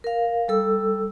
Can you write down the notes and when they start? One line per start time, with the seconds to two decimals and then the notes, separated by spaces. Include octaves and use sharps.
0.04 A#4 F5
0.48 G3 A4 E6